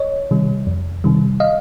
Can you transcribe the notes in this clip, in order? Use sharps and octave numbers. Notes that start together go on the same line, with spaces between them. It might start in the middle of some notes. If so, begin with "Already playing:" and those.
Already playing: C#5 D#5
C3 D#3 G3
F2
C3 D#3 G3
D#5 F5